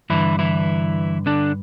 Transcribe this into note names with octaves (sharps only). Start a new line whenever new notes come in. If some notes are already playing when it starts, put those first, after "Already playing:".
G2 D3 E3 E4
E3 E4
D3 D4